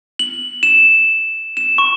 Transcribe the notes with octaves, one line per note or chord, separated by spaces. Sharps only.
F#7
E7
E7
C#6